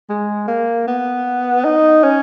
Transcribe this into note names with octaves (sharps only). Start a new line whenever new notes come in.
G#3
A#3
B3
D#4
C#4